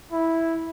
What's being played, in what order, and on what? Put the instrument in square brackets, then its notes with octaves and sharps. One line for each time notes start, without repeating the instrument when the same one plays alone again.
[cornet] E4